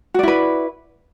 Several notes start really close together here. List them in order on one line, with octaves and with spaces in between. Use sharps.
F#4 D5 E4 B4